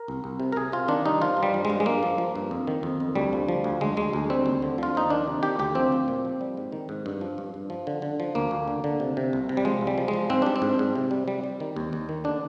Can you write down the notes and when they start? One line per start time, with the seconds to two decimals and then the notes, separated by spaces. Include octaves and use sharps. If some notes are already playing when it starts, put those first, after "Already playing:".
Already playing: A#4
0.08 C2
0.24 C2
0.40 C3
0.52 A#4
0.56 C3 G#4
0.72 C3 F4
0.88 D#3 D4
1.06 G3 D#4
1.21 F3 F4
1.37 G2
1.43 G3
1.54 F3
1.65 G2 G#3
1.80 G#3
1.86 G2 A#3
2.03 F3
2.18 F3
2.35 G2
2.51 F2
2.67 D#3
2.83 F2
3.00 F2
3.15 D2 G3
3.33 F3
3.48 F3
3.64 D2
3.81 D2 G#3
3.97 D2 G#3
4.13 D2
4.30 G3 C4
4.46 D#2
4.62 D3
4.78 F3 F4
4.95 D#2 D#4
5.10 D#3 D4
5.28 C3
5.43 D#3 G4
5.59 D2 G4
5.75 F3 C4
5.92 F3
6.08 A#2
6.25 F3
6.41 G3
6.57 G#2
6.72 D#3
6.89 G#2
7.06 G2
7.21 F3
7.38 G2
7.54 G2
7.70 F3
7.87 D3
8.02 D3
8.20 F3
8.35 D2 A#3
8.51 D2
8.68 D3
8.84 D3
9.00 C3
9.17 C3
9.33 C2
9.49 C3
9.57 G3
9.65 F3 G#3
9.81 C2
9.87 G3
9.98 F3
10.08 G#3
10.13 F3
10.30 G#2 C4
10.42 G3 D4
10.56 C4
10.62 G#2
10.79 G#2
10.96 C3
11.11 G3
11.28 G3
11.44 G3
11.60 D#3
11.76 D#2
11.93 D#2
12.09 D#3
12.24 D3 D4